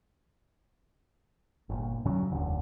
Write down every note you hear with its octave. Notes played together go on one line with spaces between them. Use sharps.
G1 A#2
G2 D3 F#3 C#4
F1 D#2 D3